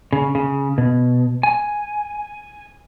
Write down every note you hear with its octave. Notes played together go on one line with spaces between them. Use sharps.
C#3
C#3
B2
G#5